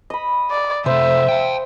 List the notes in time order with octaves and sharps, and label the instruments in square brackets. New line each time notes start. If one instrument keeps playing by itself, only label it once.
[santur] D#5 B5
[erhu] D5
[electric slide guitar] C3 A3 [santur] C5 [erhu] E5
[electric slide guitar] F5 G5